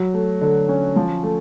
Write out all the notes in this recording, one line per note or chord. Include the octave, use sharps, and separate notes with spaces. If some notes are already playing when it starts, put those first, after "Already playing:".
Already playing: F#3
A3
D3
C#4
F3
A3